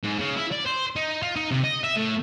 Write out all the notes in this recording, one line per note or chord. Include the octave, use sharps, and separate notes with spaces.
G#2
C#3
E4
D5
C5
D#4
F4
D#4
C3
D#5
E5
A2